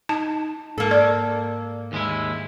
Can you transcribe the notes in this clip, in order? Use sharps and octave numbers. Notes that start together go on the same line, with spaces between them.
D#4 A5
G#2 A#3 A4
D5
D#2 G#3 E4